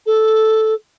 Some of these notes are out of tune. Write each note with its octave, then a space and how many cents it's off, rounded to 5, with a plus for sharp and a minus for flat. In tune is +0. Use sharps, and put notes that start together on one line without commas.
A4 -5